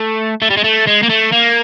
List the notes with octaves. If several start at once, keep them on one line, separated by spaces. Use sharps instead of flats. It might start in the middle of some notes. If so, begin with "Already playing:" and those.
Already playing: A3
A3
G3
G#3
A3
G#3
A#3
A3
A#3